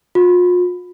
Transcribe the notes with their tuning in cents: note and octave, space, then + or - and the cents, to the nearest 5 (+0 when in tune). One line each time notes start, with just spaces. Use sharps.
F4 +40